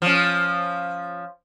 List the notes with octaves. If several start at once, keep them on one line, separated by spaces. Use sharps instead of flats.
F3 C#4